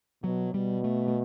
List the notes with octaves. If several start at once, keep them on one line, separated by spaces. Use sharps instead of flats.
B2 F#3
B2 G3
A3
A3